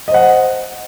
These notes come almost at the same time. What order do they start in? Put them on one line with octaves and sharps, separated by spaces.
D#5 C5 F#5